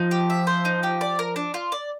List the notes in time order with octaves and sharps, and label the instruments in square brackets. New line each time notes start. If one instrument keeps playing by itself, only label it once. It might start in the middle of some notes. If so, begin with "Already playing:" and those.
Already playing: [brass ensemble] F3 [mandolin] D#4
[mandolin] G4
E5
C5
D#4
G4
D5
A#4
D4
F4
D5